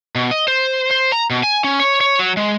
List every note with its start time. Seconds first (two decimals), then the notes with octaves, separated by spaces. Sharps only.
0.15 B2
0.31 D#5
0.48 C5
0.91 C5
1.12 A#5
1.30 B2
1.43 G#5
1.64 C#4
1.80 C#5
2.01 C#5
2.19 F#3
2.37 G#3